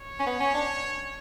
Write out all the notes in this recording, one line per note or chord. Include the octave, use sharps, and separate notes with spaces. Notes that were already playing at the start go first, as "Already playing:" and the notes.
Already playing: C#5
C#4
B3
C#4
D4